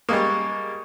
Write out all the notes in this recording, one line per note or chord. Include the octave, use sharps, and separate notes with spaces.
G3 G#3 A#3 C#6 D#6